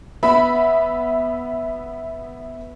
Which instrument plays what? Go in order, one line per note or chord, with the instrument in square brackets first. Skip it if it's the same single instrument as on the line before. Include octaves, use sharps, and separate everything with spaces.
[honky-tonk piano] B3 E5 B5